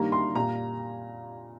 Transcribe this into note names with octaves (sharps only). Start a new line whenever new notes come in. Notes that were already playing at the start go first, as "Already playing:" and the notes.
Already playing: G2 D#3 G3 A#3 A#5
C6
A#2 G3 A#3 A#5